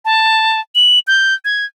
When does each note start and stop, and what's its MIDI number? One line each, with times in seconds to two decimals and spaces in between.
0.05 0.60 81
0.75 0.99 102
1.07 1.34 91
1.45 1.65 92